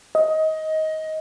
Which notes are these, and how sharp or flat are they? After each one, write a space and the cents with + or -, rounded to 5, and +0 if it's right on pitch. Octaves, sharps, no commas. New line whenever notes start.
D#5 +20